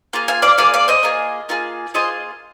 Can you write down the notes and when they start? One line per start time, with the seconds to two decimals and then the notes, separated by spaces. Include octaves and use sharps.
0.13 A#3 F4 G#4
0.28 F5 G#5
0.42 D5 F5
0.58 A#3 F4 G#4 D5 F5
0.74 D5 F5
0.88 C5 D#5
1.03 A#3 F4 G#4
1.49 A#3 F4 G#4
1.94 A#3 F4 G#4 C5 D#5